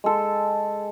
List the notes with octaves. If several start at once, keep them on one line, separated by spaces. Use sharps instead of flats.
G#3 A4